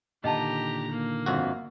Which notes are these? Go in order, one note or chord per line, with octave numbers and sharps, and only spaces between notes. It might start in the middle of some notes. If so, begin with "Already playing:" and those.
A#2 D3 D#3 G4 D#5 F#5 A5 A#5
A#3
G1 F2 F#4